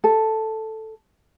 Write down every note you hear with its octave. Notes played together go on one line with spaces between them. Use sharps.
A4